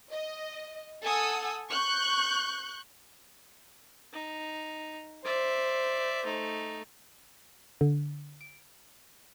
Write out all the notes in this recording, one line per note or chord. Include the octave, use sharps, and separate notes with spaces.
D#5
A4 F#5 G#5 D#6 E6
C#6 F#6 G6
D#4
C5 D5 E5
A3 D#4
D3
D7